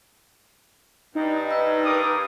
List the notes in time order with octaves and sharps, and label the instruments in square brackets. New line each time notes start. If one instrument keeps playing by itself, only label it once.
[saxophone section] G2 [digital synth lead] D#4
[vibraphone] B4 E6
[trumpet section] A#4 D6 D#6